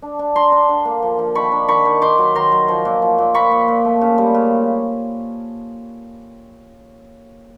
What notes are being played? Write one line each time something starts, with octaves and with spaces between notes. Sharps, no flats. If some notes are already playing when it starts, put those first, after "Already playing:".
D4
D4
D4 A#5 C6
D4
D3
A#3
F3
F3
D#3 B5 C#6
D4
D#3 B5 C#6
D#3
D#3 C6 D6
F#3
D#3 A#5 C6
F#3
F3
A#2
F3
A#2
A#2 B5 C#6
A#2
A#2
A3
C#3
G3
C#3